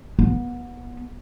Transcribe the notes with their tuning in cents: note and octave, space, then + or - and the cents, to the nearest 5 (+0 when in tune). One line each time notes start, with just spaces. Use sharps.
B3 -25